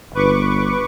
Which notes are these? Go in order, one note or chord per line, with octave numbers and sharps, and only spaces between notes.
G1 B4 C#6 D6